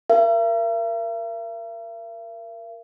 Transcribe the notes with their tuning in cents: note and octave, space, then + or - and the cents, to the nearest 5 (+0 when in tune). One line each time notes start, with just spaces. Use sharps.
A#4 +0 E5 +45